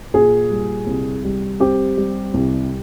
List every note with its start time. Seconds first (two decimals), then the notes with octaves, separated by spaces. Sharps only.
0.14 A#2 G#4
0.50 G3
0.87 C2
1.24 G3
1.60 C4 G4
1.97 G3
2.34 C2